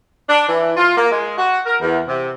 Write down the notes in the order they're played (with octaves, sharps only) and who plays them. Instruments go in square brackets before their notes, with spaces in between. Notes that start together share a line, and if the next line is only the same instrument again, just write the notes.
[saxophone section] D4
E3
F4
A#3
G#3
F#4
A#4
E2
C3